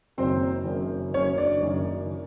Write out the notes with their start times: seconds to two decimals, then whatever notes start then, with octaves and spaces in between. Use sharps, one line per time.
0.18 F#1 F#2 D#3 F#3 C4 C5
0.66 F#1 F#2 D#3 F#3
1.14 F#1 F#2 D#3 F#3 C#4 C#5
1.38 D4 D5
1.62 F#1 F#2 D#3 F#3